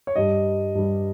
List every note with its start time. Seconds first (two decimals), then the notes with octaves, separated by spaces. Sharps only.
0.07 C#5
0.16 G2 G3 D#5
0.75 G2 G3